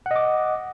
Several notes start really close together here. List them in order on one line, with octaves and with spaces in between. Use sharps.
F#5 D#5 D6